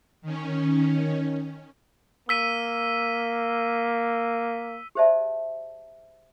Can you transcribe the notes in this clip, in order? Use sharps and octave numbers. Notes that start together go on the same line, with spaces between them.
D#3 C#4
A#3 E6 B6 D#7
G4 G#4 C5 D5 E5 A5